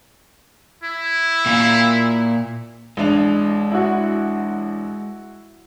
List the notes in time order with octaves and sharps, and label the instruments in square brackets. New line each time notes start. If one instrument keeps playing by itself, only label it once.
[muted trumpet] E4
[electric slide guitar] A#2 E5 F5
[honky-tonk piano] A1 D4 F7 [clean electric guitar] G#3
[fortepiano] E4 F#4